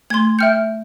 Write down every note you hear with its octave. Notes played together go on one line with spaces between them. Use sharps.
A3 C6 G#6
E5 G5 F6 G6 C#7